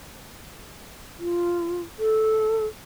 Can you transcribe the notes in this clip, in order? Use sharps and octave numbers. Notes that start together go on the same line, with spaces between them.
F4
A4